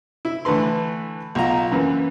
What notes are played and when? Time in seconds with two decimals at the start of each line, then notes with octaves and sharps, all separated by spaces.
0.25 E4
0.45 D3 E3 A3 B4 C6
1.35 B1 F4 A#5
1.71 F#2 E3 A#3 B4